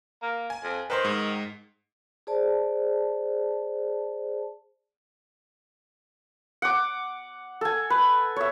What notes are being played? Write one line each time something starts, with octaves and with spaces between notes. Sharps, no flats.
A#3
G#5
F2
D#3 B4 C5 C6
G#2
G#4 C5 D5 A5
F#5 D6
A4 G#5
B4
C#5 E5